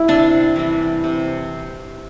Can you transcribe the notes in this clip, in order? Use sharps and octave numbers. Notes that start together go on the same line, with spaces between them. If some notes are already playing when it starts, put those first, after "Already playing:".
Already playing: G3 E4
C3 D4
E3 G3
C3